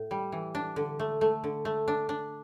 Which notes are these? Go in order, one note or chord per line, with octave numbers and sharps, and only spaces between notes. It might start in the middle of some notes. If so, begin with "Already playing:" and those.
Already playing: A2
G3
E3
D4
D3
A3
A3
D3
A3
D4
D4